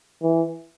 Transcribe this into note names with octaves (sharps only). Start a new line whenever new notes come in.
E3